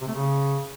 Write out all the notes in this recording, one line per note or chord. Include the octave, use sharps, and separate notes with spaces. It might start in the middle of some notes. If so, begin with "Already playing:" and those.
C3
A3
C#3